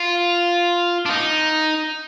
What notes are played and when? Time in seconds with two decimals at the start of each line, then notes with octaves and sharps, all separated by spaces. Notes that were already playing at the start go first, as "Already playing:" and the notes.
Already playing: F4
1.06 D4
1.10 D#4